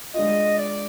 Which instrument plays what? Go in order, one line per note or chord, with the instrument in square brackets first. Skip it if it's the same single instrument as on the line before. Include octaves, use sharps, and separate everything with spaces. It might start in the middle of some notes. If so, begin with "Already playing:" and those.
[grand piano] G#3 D4 F4 [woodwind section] D#5
[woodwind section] D5